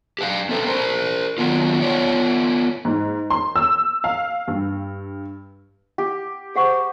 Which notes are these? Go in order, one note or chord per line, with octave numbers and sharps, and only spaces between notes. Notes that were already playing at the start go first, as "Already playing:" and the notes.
G4 B4 F5
C4 A4 B4
A#4 C5
D#3 F#3 B3 F4
B3 F4 C#5 D5
G#2
C6
E6
F5
G2
G4
G#4 C5 F#5 C#6